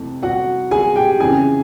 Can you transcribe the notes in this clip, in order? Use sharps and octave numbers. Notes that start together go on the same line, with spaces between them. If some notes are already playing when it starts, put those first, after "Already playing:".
Already playing: F2 C3 E3 A3
F#4 F#5
G#4 G#5
G4 G5
F2 C#3 E3 G#4 G#5